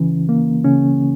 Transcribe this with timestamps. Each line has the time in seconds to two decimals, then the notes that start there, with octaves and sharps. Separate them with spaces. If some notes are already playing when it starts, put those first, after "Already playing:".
Already playing: C#2 C#3 E3 C#4
0.29 A#3
0.65 C#3 C#4